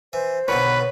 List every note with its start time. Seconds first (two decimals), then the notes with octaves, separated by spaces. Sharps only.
0.13 E3 C5
0.48 B2 D3 D#3 B4 C#5